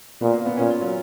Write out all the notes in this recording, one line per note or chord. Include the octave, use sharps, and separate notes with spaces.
A#2 B3
A#3
B3
A#2 C#4
F4
F#3